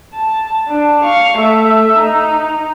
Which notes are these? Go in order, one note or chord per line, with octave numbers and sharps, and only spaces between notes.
A5
D4
F5 C#6
A3 E5
D#4